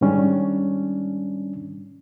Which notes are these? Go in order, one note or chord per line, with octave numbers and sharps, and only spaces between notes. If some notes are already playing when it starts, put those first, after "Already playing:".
G#2 D#3 G3 C#4 D4